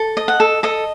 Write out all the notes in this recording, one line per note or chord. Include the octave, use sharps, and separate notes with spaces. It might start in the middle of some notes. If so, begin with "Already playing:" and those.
Already playing: A4
D#5
F#5
A4
A4 D#5